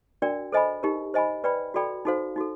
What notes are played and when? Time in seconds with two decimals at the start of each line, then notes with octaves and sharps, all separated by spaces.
0.22 D4 F#4 A#4 D5 G5
0.52 A4 C5 D#5 G#5 B5
0.83 D#4 G4 A#4
1.14 C5 D#5 G#5 B5
1.44 B4 D5 G5 B5
1.74 F#4 A4 D5 G5 B5
2.05 D#4 F#4 A4 C5 F5
2.36 D#4 F#4 A4